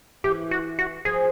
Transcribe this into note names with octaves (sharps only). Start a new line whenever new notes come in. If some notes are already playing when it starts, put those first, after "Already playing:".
E3 G4
F#4
F#4
F3 G#4